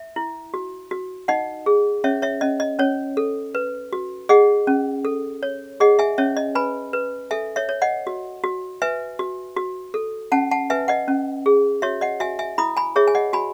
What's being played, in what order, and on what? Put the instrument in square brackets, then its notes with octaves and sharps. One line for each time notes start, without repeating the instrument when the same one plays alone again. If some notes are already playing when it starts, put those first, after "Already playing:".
Already playing: [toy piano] E5
E4
F#4
F#4
D#4 D#5 F#5
G#4
C#4 C#5 E5
C#5 E5
C#4 D#5
D#5
C#4 C#5
A4
B4
F#4
G#4 D#5 F#5
C#4
A4
C#5
G#4 D#5 F#5
E5 G#5
C#4 C#5 E5
D#5
B4 G#5 B5
B4
A4 E5 G#5
C#5 E5
C#5
D#5 F#5
F#4
F#4
B4 E5 G#5
F#4
F#4
A4
C#4 F#5 A5
F#5 A5
B4 E5 G#5
D#5 F#5
C#4
G#4
F#4 C#5 E5
D#5 F#5
F#4 E5 G#5
E5 G#5
E4 B5 D#6
G#5 B5
G#4 C#5 E5
G#5
D#5 F#5
F#4 G#5 B5